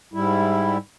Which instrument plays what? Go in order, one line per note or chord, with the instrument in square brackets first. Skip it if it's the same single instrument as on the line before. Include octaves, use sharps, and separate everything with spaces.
[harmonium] G#2 G3 E4